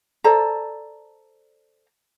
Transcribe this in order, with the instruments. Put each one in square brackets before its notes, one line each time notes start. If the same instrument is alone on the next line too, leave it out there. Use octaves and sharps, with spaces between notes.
[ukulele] A4 C5 D5 A#5